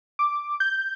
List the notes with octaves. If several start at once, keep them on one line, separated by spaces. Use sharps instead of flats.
D6
G6